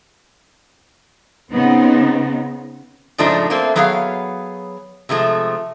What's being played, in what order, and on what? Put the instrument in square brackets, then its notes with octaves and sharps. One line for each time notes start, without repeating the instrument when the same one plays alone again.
[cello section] C#3 B3 C4 D#4
[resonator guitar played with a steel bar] G#2 C#3 F3 A3 D4 D#4
A3 A#3 C4
F#3 B3 D4 G#4 C#5 F5
C3 F3 G#3 A3